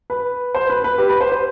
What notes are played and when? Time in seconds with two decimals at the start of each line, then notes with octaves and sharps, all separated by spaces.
0.10 B4
0.55 C5
0.70 B4
0.84 B4
0.98 G4
1.10 B4
1.21 C5
1.32 C5